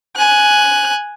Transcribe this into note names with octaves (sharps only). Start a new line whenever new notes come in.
G#5 F#6